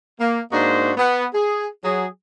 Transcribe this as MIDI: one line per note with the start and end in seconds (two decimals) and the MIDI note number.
0.20 0.40 58
0.52 0.92 44
0.52 0.92 58
0.52 0.92 62
0.52 0.92 66
0.52 0.92 72
0.52 0.92 75
0.97 1.26 59
1.34 1.68 68
1.84 2.06 54
1.84 2.06 68